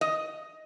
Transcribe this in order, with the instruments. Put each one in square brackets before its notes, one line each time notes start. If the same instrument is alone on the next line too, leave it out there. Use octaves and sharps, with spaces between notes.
[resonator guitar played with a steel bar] D#5